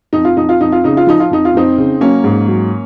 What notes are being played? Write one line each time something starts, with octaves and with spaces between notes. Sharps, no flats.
F2 D#4
F4
F2 D#4
F4
F2 D#4
F4
C#3 D#4
F4
F3 D#4
F4
F2 D#4
F4
F2 C4 D#4
C#3
F#3 A#3 C#4
G#2
F#3